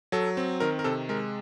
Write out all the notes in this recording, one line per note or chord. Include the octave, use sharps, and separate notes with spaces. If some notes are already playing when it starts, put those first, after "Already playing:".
F#3 A4
C4
D#3 A#4
A#4
C3 A4
G#3 A#4